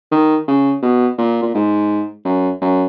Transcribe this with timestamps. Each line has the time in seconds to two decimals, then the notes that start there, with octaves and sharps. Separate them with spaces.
0.11 D#3
0.48 C#3
0.82 B2
1.18 A#2
1.42 A#2
1.55 G#2
2.25 F#2
2.61 F#2